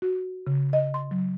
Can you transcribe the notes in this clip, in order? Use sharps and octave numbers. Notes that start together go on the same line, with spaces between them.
F#4
C#3
D#5
C6
F#3